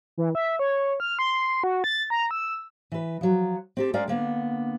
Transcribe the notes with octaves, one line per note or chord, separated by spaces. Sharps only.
E3
E5
C#5
F6
C6
F#4
A6
A#5
E6
E3 B4
F3 F#3
C4 G4 A4
G#3 C#4 A#4 D5 F5 G5
D3 A#3 B3